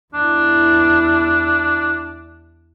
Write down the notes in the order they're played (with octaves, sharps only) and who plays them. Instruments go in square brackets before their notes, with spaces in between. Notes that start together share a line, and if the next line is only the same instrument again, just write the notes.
[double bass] E2 E4 [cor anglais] D4